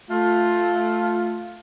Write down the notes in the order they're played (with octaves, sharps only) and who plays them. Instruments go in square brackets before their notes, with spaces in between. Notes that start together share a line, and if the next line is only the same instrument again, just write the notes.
[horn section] A3 F4